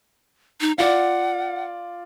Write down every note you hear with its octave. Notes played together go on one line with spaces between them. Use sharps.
D#4
F4 D5 F#5